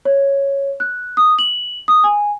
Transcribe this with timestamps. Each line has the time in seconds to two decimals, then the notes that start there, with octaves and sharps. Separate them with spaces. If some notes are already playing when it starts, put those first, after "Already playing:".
0.05 C#5
0.80 F#6
1.17 D#6
1.39 F#7
1.88 D#6
2.04 G#5